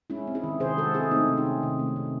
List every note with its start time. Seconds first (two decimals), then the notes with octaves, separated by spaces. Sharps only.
0.10 G#3 C#4 E4
0.27 C4
0.35 E4 G#4
0.44 D#3
0.60 C3 G#4 C5
0.77 G#3 F#4 A4
0.94 C4 E4 G#4
1.11 A3 C4 D#4
1.28 C3
1.37 C#4
1.46 D#3
1.63 C3
1.79 A3
1.96 C3